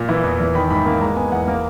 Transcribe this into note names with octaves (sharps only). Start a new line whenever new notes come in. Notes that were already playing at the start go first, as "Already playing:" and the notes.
Already playing: A#2
E3
E2
E2
D#3 B5
G#2 B5
A#3 B5
G#3 A#5
B3 G#5
E2 F#5
A#3 A#4